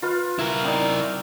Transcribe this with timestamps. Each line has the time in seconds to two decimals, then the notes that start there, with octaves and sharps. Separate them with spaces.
0.02 F4 B4 F5
0.39 E4 A#4
0.63 C4 D#4 D5